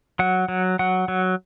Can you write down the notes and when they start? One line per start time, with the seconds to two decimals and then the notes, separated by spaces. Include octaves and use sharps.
0.19 F#3 F#5
0.48 F#3
0.79 F#3 F#5
1.08 F#3